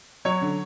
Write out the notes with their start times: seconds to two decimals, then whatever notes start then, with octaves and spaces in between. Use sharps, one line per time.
0.25 F#3 C#5
0.41 D3